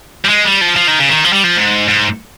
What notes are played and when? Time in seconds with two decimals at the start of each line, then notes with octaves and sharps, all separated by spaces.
0.25 G3
0.29 G#3
0.45 G3
0.61 F3
0.76 F3
0.88 D#3
0.99 C#3
1.09 D#3
1.25 F3
1.33 G3
1.44 F3
1.56 G#2
1.88 G#2